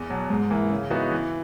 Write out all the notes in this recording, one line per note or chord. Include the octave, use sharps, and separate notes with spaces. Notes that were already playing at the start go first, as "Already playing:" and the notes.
Already playing: E2
B2 F#3
G#2
E3 A#3
C#3
E3 B3 D#4 F#4
E3